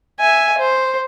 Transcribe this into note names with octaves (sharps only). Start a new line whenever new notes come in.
E5 G#5
C5